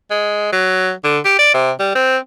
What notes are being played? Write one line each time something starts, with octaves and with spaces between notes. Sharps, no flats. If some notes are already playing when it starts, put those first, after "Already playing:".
G#3
F#3
D3
G4
D5
C3
G3
C4